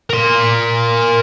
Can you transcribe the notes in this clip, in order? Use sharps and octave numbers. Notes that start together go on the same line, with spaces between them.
A#4 C6